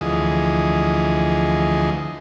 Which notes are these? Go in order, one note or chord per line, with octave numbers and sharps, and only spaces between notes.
D2 E3 F3 G#4 D#5